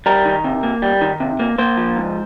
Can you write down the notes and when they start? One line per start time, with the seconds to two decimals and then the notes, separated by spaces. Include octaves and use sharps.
0.06 G3 A#4
0.25 D#3
0.44 C3
0.63 A#3
0.82 G3
1.01 D#3
1.20 C3
1.39 A#3
1.58 A#3 C5
1.77 F3
1.96 G#2